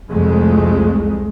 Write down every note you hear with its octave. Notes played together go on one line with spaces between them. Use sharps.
C2 F2 G#3 A3